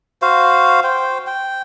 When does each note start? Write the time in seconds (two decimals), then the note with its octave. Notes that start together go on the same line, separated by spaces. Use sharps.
0.22 F#4 C5 F5
0.84 C5 G5
1.27 G5